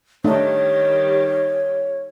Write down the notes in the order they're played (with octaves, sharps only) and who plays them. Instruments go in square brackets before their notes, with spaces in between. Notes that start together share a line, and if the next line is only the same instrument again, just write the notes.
[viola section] D#3 G3 G4 [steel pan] A3 D4 D#4 [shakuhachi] C#5